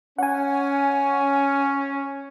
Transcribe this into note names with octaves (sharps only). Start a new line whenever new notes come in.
C#4 F#5 G#5